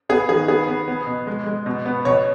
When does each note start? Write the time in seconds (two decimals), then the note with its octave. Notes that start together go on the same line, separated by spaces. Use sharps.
0.09 B3 G#4
0.28 D#3 G#4
0.48 B3 G#4
0.68 B3
0.88 B3
1.07 B2
1.27 G#3
1.46 G#3
1.66 B2
1.86 B3
2.05 B2 C#5